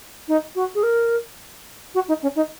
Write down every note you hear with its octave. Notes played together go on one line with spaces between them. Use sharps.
D#4
F#4
G#4
A#4
F#4
D#4
C#4
D#4